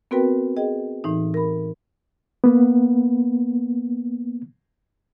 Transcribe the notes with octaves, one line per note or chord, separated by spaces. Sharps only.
B3 C4 F#4 A#4 B4 G5
G#4 D#5 G5
A2 E3 D#4
A#4 B5
A#3 B3